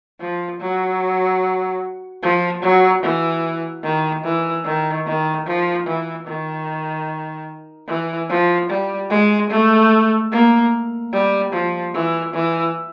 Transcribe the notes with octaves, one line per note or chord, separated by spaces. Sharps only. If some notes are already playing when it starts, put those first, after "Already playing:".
F3
F#3
F3
F#3
E3
D#3
E3
D#3
D#3
F3
E3
D#3
E3
F3
G3
G#3
A3
A#3
G3
F3
E3
E3